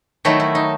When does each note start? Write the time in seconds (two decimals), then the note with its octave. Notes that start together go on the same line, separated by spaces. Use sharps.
0.25 D#3 F#3 A3 E4
0.40 E4
0.55 D#4